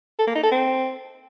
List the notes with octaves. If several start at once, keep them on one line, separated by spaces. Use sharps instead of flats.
A4
A#3
D#4
A4
C4